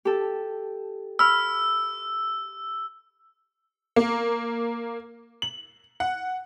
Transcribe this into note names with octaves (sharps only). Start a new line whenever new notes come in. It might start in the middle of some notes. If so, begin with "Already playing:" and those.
G4 A4
B5 E6 F6
A#3
F#7
F#5